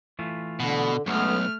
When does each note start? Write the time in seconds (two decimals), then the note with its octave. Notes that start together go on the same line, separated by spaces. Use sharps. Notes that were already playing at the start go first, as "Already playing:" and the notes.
0.19 E3 A3 F4
0.60 B2 D3
1.06 B1 F#3 G#3 A3 B3 C#4 F6